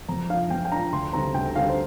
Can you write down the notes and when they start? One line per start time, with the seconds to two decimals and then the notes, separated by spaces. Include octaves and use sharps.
0.09 F2 A#5
0.30 F3 D4 F5
0.50 F2 G5
0.65 G5
0.72 F3 D4 A#5
0.93 D2 C6
1.13 D3 G3 C4 A#5
1.34 D2 G5
1.55 D3 G3 C4 F5
1.69 C5